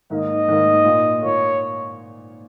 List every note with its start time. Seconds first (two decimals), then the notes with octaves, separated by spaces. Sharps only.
0.10 G#2 D#3 A#3 D#5
0.48 G#2 D#3 A#3
0.85 A#2 A#3 F4
1.22 A#2 A#3 F4 C#5